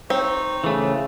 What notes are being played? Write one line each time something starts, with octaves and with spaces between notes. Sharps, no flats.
C4 D#4 C#5
C#3 E3 A3